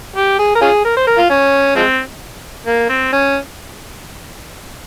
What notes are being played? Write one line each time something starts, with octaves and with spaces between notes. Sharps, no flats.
G4
G#4
A#4
C#4 F4 G#4
A#4
C5
A#4
F4
C#4
F3 G#3 C4
A#3
C4
C#4